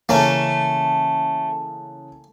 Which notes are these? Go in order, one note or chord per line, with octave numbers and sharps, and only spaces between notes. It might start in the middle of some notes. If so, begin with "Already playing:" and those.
C#3 E3 A3 A#3 C#4